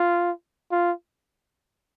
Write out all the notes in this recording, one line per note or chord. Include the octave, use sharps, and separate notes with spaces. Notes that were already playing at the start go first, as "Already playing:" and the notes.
Already playing: F4
F4